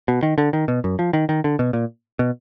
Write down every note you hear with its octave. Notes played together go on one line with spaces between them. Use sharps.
B2
D#3
D3
D#3
B2
F#2
F3
D#3
D#3
D3
B2
A#2
B2